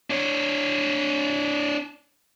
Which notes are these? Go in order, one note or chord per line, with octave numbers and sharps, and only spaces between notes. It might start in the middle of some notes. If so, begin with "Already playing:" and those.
D4 C#5